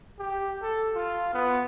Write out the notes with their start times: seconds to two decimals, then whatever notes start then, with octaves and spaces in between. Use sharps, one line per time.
0.19 G4
0.63 A4
0.95 F4
1.34 B3